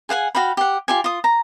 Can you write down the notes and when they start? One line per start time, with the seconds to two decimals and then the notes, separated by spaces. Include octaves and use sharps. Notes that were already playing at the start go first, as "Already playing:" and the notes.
0.09 G#4 F5 F#5 G#5
0.35 F#4 F5 G5 B5
0.57 G4 F#5
0.88 F4 G4 G#5
1.04 F4 D#6
1.24 A#5